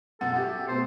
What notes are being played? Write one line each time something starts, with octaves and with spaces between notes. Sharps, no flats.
F#2 B2 A4 F#5
F#4 G4 E5
B2 A3 B3 C5